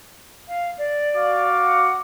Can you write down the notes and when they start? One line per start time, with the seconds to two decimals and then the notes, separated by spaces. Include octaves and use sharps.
0.48 F5
0.78 D5
1.16 F#4 F5 D6
1.63 F#5